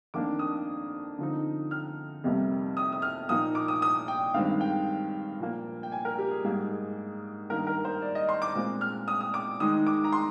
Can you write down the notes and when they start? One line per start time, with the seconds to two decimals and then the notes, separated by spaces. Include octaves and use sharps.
0.14 F2 D#3 A#3 D4 D6
0.39 D#6
1.18 D3 F3 C4 D#4
1.71 F6
2.24 F2 C3 G3 A#3
2.77 D#6
2.92 D#6
3.02 F6
3.29 A#2 F3 A#3 D#4 D#6
3.55 D6
3.68 D#6
3.82 D#6
4.08 G5
4.34 G2 D#3 G#3 C4 F5
4.61 G5
5.40 A#2 F3 A#3
5.83 G5
5.92 G#5
6.05 A#4
6.18 G4
6.31 G#4
6.44 G#2 G3 A#3 D#4 G#4
6.71 G#4
7.50 G2 D#3 A#3 D#4 A#4
7.67 A#4
7.85 C5
8.02 D5
8.15 D#5
8.29 C6
8.42 D6
8.55 A#2 G#3 C4
8.81 F6
9.08 D#6
9.21 D#6
9.34 D6
9.60 D#3 G#3 D#4 D#6
9.87 D6
10.04 A#5
10.13 C6